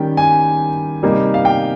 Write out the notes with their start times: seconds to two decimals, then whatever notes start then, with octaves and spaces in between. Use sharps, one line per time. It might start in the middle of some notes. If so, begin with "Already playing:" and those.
Already playing: D#3 G3 A#3 C#4 G5
0.17 G#5
1.03 C3 G3 A#3 D#4
1.34 F5
1.45 G5